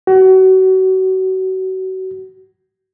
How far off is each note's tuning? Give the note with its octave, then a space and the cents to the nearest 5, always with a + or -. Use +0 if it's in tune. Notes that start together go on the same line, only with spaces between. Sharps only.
F#4 +30